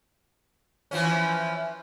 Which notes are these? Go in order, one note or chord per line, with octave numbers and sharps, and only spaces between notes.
E3 F3 C#4